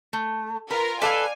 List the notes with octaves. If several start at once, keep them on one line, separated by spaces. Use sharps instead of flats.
A3
F4 A#4 B4
A4 B4 D5 E5 F5 G#5